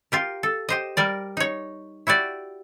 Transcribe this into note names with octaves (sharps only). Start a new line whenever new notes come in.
F4 G4 A#4
A4
G4 C5 D#5
G3 A#4 D5
D#4 C#5
E4 F#4 G4 D5